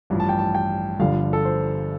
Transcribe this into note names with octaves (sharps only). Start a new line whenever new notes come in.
A1 G2 F3
A5
G5
A5
G5
G1 G2 D3 F3 F5
A4
C5